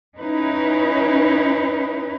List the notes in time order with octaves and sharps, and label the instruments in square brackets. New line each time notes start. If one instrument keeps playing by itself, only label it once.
[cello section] C#4 D#4 E4 B4